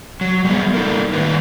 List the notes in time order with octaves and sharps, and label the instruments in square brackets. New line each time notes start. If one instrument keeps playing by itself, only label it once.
[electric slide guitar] F#3
G3 G#3 B3
A#3 D#4 A4 A#4
A2 D#3 G3 B4